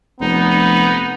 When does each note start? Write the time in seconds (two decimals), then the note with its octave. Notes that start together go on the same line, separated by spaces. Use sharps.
0.20 F1 B3 D#4